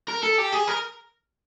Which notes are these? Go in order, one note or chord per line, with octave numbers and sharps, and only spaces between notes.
A#4
A4
G4
G#4
A#4